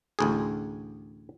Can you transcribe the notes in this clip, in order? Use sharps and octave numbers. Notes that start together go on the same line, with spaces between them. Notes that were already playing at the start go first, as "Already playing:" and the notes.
A1 D2 G#4